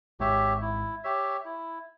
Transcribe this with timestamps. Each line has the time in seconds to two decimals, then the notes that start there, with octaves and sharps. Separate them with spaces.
0.20 G#1 G#2 G4 C#5 E5
0.62 E4
1.04 G4 C#5 E5
1.45 E4